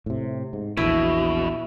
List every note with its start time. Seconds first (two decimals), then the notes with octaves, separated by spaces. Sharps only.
0.06 A2 C3
0.53 G#2
0.77 A#1 E2 B2 E4